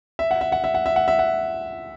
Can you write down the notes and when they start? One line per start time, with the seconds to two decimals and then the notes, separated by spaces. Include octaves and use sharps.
0.19 E5
0.31 F#5
0.41 E5
0.52 F#5
0.64 E5
0.74 F#5
0.86 E5
0.96 F#5
1.08 E5
1.19 F#5